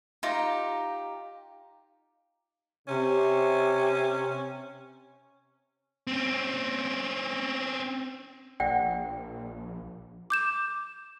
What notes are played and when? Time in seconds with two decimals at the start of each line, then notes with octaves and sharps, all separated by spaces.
0.23 D#4 F4 G4 A#5
2.88 C3 C#4
6.07 C4 C#4
8.60 A#1 D5 F#5 G5
10.30 D6 G6 E7